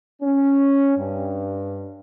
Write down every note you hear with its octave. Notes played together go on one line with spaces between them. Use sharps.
C#4
G2